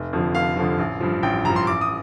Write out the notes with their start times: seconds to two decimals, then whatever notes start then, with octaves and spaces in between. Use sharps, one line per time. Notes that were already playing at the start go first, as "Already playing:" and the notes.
Already playing: F1
0.13 F2 D3 F3
0.35 F1 F5
0.57 F2 D3 F3
0.79 A1
1.00 G2 F3
1.23 A1 G5
1.45 G2 F3 A#5
1.56 C6
1.67 A1 D6
1.81 D#6